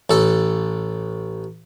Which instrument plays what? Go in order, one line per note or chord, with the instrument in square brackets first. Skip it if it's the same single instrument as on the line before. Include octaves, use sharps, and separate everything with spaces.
[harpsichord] A1 A4